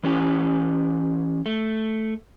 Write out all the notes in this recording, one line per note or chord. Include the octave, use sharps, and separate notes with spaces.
E3 C#4 G4
A3